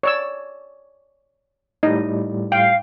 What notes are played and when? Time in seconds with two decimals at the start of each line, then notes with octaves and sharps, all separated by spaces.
0.03 C#5 D5 E6
1.83 A2 G3 D#4 D#5
2.52 F5 G5